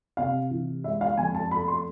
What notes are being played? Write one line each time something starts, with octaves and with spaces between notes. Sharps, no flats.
C3 F5
E3
G#3 E5
F5
F2 G#5
A5
A3 B5
C6